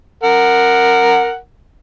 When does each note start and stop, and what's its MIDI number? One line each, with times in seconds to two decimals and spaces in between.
0.23 1.36 70
0.23 1.36 78